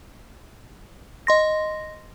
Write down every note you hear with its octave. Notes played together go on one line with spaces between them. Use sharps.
D#5 C6 A#6